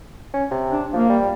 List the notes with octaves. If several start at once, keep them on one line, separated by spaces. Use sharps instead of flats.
C#4
C3
D4
F3 A#3
G3